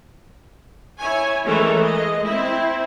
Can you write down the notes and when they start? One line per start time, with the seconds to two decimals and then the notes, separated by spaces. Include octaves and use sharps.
0.98 E4 C#5 G#5
1.45 E3 G#3 A3 A4 A#4 C#5
1.79 G#3 D#5
2.25 C4 E4